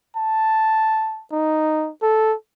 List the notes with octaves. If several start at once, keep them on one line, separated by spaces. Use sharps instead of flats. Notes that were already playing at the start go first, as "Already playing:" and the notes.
A5
D#4
A4